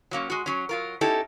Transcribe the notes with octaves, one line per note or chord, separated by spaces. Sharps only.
F#3 A#3 C#4
G#3 F#4
F#3 C#4
F#3 F4 A#4
C#4 D#4 E4 G4 A4